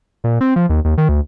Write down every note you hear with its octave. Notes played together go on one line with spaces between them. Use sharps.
A#2
C4
F3
D#2
D#2
D#3
D2